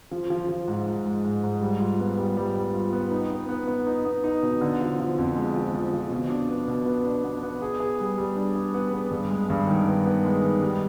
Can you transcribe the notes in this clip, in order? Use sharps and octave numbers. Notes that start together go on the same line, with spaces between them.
F3
F3
F3
G#2
G#2
G#3
G#2
G#2
G3
F4
B3
G3
G3
G3
F4
B3
D#4
B3
B3
B3
D#4
B3
D#4
B2
D3
F3
F3
F2
G#3
F3
F3
F3
B2
D4
B3
B2
B3
D4
B3
B3
G#4
G#4
G3
G3
D4
G#4
B3
B3
G2
G#3
G2
D#3
B3
B3
G#3
D#3
G3